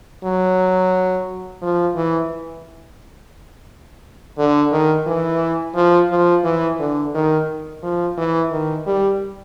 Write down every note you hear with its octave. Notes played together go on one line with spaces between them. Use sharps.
F#3
F3
E3
D3
D#3
E3
F3
F3
E3
D3
D#3
F3
E3
D#3
G3